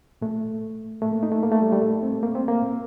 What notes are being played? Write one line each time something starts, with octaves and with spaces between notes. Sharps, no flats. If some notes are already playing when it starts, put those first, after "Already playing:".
A#2 A3
A2 A3
A#3
D#4
A3
A#3
A3
G3
G3
A#2 A3
C4
A#3
C4
A#3
A#2